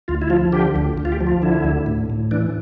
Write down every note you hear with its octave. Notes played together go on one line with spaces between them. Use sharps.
D2 F4
E4
F3 F4
D3 G4
D2
D2
F4
G4
F3
F4
D3 E4
D2
A2
A2
E3 D4